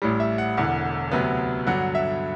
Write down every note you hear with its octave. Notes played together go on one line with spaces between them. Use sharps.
A1 A2 G3
E5
F#5
E1 E2 D3 F#5
D2 C3 F#3 B3
G2 D3 F#3 F#5
E5